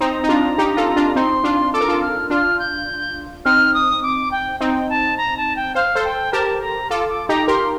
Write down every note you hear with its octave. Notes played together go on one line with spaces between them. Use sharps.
C4 D#4 A#5
D#4
D4 F4
D#4 G4
F4 A4
D4 F4
C4 D#4 C6
D4 F4
A4 D6
A#4
F4 A4
F6
D4 F4 F6
G6
C4 D#4 F6
D#6
D6
G5
C4 D#4 G5
A5
A#5
A5
G5
C5 F5
A4 C5
G5
G4 A#4 A5
A#5
F4 A4 D6
D6
D#4 G4 A#5
G4 A#4 C6